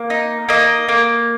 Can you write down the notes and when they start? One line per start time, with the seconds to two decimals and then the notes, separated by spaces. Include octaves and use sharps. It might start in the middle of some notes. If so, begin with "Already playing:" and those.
Already playing: A#3
0.10 D#4
0.49 A#3 D#5
0.89 A#3